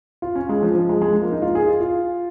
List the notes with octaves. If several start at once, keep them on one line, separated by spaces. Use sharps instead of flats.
F4
C#4
G#3
F3
F3
G#3
G#3
F3
A#3
D#4
F4
G#4
F4
F4